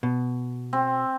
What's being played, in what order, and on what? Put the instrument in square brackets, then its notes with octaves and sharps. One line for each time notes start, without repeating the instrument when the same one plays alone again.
[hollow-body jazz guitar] B2
[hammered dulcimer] C4